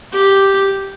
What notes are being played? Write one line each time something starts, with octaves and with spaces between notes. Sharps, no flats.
G4